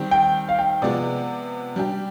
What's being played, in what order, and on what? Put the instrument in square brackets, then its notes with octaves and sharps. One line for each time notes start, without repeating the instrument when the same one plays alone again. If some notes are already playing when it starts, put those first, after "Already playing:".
Already playing: [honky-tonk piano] D#3 G3 C4 G4
[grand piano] G5
F5
G5
[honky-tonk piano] C3 F3 G#3 B3 [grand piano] D5
[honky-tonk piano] G3 D4 G4